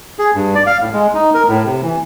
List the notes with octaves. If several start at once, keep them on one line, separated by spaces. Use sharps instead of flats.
G#4
G2
D5
F5
A2
G#3
D#4
A#4
A2
C3
E3